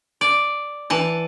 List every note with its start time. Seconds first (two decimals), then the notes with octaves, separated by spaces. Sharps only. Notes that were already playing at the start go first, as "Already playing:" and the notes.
0.21 D5
0.90 E3 A5